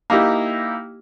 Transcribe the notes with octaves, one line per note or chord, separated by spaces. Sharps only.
A#3 D#4 E4 G4